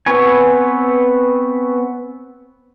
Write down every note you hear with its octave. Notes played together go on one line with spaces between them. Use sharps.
B3 C4 B4 C#5 G#5